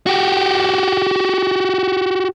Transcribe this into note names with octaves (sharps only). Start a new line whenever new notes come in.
F#4 G4